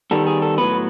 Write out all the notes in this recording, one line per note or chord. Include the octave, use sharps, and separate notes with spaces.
D#3 G3 B3 A4
G#4
A4
A2 F#3 B3 B4